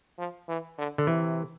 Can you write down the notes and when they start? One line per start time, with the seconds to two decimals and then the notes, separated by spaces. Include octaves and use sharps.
0.18 F3
0.48 E3
0.78 D3
0.98 D3
1.07 C3 E3